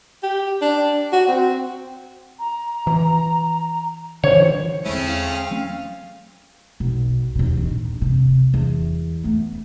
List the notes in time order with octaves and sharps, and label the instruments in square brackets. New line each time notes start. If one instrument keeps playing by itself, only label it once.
[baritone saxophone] G4
D4
F#4
C4
[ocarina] A#5
[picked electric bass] E3
[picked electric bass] D3 E3 [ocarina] C5 [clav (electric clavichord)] C#5
[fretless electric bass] E2 D3 G#3 [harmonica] A3 C#4 G#4 [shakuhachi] C4 [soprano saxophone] E4
[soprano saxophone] F5
[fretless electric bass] F#3 A3 C#4
[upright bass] B1
D#2 B2
A#1 D#3
C3
E2
A3 B3